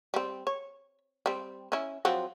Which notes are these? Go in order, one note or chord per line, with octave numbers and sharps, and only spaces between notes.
G3 C4
C#5
G3 C4
C#4 E4
F3 F#3 C4